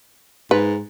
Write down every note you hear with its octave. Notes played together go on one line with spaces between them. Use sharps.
G#2 B4